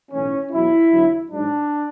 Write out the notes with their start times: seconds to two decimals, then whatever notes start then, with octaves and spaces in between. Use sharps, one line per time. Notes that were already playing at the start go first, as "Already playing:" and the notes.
0.12 B1 A2 E3 C#4
0.52 E2 B2 F#3 E4
0.91 E2 D3 F#3
1.30 A1 G#2 F#3 D4